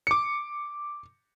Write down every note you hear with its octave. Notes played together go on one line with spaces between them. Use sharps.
D6 C#7